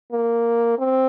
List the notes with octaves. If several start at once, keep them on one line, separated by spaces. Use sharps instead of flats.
A#3
C4